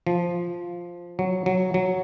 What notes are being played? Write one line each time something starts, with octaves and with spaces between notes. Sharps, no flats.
F3
F#3
F#3
F#3